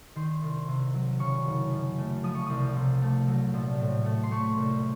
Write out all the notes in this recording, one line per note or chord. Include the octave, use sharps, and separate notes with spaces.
D#3 C6
C2
C3
F#3
C#3 C#6
F#1
F#2
A3
F3 D#6
C#6
C2 D#6
C3
A3
F#3
A#1
A2
A3
C6
A3 C#6
C2